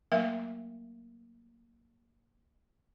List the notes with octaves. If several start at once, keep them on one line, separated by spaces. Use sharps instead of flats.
F#3 A3 A#3 A#4 E5 F5